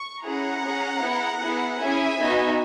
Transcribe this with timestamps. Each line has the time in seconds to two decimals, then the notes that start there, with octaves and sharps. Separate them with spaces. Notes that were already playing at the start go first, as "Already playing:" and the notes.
Already playing: C#6
0.24 C#4 E4 G#4 F#5 A#5
0.64 C#4 G#4
1.02 B3 E4 G#4
1.40 B3 E4 G#4
1.79 C#4 E4 G#4 E5 G#5
2.19 B3 D#4 F#4